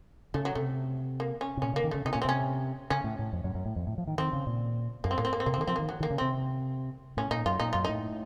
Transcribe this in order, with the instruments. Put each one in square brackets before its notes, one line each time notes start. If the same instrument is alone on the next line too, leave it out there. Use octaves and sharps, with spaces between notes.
[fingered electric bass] C#3 [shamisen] A3
[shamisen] F#3
[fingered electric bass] C3 [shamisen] A3
[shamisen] A#3
C#4
[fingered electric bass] C3
[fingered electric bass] A#2 [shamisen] C#4
[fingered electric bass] C#3
[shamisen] A#3
[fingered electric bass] D#3
[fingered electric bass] C#3 [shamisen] A3
[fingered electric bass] C3 [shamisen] D#4
[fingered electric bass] A#2 [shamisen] C#4
[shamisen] C4
[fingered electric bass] C3 [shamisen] C#4
[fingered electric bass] C#3 [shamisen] C#4
[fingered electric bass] A2
A2
F2
F#2
F#2
A2
F2
A2
F3
D#3
[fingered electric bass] D#3 [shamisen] C4
[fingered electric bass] C#3
A#2
[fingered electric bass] F#2 [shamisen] A#3
[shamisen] C4
[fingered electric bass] A2 [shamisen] A#3
[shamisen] C4
A#3
C4
[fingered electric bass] C3 [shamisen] A#3
[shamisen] C4
[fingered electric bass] D#3
[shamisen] A#3
[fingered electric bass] F3 [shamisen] C4
[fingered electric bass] D#3 [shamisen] A#3
[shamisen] F#3
[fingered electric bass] D#3 [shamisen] A#3
[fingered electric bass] C#3
[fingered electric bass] C3 [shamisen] C4
[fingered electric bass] A2 [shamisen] C#4
[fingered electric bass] A#2 [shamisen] D#4
[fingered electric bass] F#2 [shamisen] F4
[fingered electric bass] A#2 [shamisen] D#4
[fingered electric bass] F#2 [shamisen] F4
[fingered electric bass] A2 [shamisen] D#4